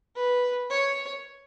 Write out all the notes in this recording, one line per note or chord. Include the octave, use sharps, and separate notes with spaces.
B4
C#5